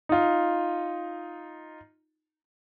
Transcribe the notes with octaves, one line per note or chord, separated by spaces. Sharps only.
D#4 F4